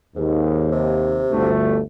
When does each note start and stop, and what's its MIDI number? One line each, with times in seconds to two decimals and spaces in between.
0.16 1.22 39
0.16 0.70 44
0.72 1.56 48
1.31 1.81 31
1.31 1.81 38
1.31 1.81 57